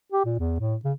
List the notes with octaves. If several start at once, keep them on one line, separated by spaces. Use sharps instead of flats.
G4
A#2
E2
A2
C#3